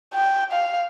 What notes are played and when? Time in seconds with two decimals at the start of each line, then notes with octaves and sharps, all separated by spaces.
0.14 G5
0.52 F5